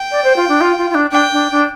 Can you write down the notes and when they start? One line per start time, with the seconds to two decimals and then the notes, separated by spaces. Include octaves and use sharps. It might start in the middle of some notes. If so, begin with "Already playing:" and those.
Already playing: G5
0.11 D5
0.24 C5
0.36 F4
0.49 D4
0.61 F4
0.79 F4
0.90 F4
0.95 D4
1.12 D4 G5
1.32 D4
1.52 D4